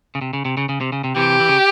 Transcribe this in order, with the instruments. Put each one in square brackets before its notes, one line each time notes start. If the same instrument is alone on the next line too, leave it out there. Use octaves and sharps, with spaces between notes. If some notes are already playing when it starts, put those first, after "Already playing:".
[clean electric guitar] C#3
C3
C#3
C3
C#3
C#3
C3
C#3
C3
[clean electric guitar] C3 E3 [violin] G4
[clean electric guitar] E3
C#3